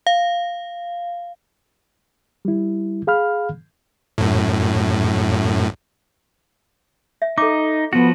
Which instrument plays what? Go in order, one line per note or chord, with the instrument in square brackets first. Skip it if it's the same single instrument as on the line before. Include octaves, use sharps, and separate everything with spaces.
[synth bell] F5
[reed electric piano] G3 E4
G#4 F5 B5 F6
[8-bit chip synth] F#2 A2
[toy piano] E5
[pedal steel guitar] D#4 [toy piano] A4 D6
[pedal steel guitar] F3 F#4 [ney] B3